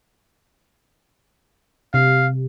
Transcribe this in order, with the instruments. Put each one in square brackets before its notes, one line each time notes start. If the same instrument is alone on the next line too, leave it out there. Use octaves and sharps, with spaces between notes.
[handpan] C3 [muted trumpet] F5